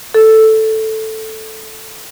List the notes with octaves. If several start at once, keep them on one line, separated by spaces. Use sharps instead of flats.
A4